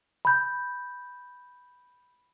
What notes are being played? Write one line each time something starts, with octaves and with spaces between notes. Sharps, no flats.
B5 G6